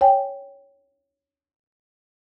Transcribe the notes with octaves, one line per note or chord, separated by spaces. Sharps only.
C#5 G5 G#5